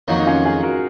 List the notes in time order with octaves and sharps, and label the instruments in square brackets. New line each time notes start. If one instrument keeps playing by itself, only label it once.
[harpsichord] F2 D#3 F#3 A#3 [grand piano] D#4
[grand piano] D#4
C#4 F4
F4 G#4
F#4 A#4